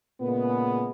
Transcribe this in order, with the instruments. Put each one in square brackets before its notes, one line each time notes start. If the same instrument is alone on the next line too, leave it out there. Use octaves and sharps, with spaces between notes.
[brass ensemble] A#2 C#3 G#3 B3